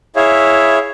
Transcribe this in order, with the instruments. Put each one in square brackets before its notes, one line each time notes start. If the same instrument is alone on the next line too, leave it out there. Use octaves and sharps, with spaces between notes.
[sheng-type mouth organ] E4 G#4 C#5 E5 F5